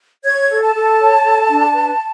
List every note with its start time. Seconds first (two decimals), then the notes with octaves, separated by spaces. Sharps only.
0.24 C#5 G#6
0.49 A4
0.62 A5
0.75 A4
0.98 C#5
1.24 A4
1.49 D4
1.73 B4